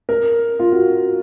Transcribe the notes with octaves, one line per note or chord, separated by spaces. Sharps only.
A#4
F4
F#4